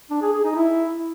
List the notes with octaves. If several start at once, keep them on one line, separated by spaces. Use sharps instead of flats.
D4
G#4
G#4
D#4
E4